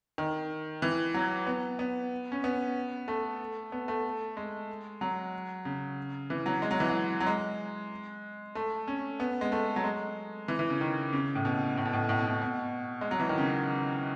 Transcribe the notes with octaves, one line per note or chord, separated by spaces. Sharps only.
D#3
E3
F#3
B3
B3
C#4
B3
A3
B3
A3
G#3
F#3
C#3
E3
F#3
G#3
F#3
E3
F#3
F#3
G#3
A3
C#4
B3
G#3
A3
F#3
G#3
E3
E3
C#3
D#3
C#3
A2
B2
A2
B2
A2
A2
B2
A2
B2
G#3
F#3
E3
D#3
C#3